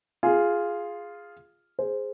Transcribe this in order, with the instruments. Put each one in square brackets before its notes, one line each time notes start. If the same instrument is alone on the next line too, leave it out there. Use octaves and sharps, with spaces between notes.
[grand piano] F4 G#4
G#4 C5